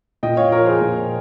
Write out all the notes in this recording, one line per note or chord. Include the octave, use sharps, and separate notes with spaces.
A#2 D#5 G5
C#5 F5
F3 A#4 C#5
G#4 C5
A#2